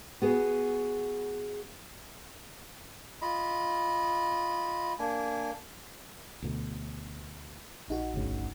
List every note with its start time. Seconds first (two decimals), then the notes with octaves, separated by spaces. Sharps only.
0.22 B3 F#4 G#4
3.22 F4 D#5 B5
4.99 A#3 D4 G#5
6.42 D2 B2
7.88 A#1 D#4 F#4
8.14 G1 D2 C#3